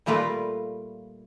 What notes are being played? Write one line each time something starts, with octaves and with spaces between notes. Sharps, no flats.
A#2 G3 A3 A#3 F4 B4